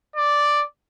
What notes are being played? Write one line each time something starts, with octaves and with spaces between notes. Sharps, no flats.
D5